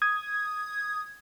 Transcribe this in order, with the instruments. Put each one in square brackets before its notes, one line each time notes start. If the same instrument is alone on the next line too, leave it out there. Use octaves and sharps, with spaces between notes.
[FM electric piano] D#6 G#6